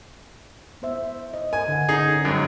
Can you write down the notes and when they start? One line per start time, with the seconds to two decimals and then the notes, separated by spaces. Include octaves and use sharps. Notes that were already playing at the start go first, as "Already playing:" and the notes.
0.82 B3 C5 E5
1.34 D#5
1.53 A#4 G#5
1.68 D3 F#5
1.89 C#4 D#4 G#4
2.25 G#1 F#2 G3